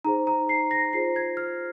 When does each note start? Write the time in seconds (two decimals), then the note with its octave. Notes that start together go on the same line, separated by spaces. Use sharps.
0.05 D#4 G#4 C5 A#5
0.27 A#5
0.49 C7
0.71 A#6
0.93 F4 G#4 C5 C7
1.16 G#6
1.37 F6